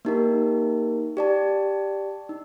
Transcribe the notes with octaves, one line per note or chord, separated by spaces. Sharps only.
A#3 D#4 G4 A#4
G4 D5 A5
D#4